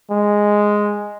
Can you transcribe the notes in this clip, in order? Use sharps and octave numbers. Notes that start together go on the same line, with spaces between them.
G#3